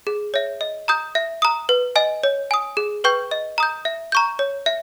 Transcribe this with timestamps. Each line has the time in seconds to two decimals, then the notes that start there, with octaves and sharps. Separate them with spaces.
0.07 G#4
0.34 C#5 E5
0.61 D#5
0.88 A#5 D#6 G6
1.15 E5
1.42 A#5 D#6
1.69 B4
1.96 D#5 G#5
2.23 C#5
2.51 G#5 D#6
2.77 G#4
3.04 B4 G5 C#6 G6
3.31 D#5
3.58 A#5 D#6 G6
3.85 E5
4.12 A#5 C#6 G6
4.39 C#5
4.66 E5